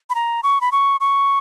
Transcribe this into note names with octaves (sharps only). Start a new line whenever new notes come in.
B5
A#5
C#6
B5
C#6
C#6